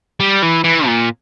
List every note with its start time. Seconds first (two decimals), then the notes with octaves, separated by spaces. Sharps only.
0.20 G3
0.42 E3
0.64 E3
0.87 A#2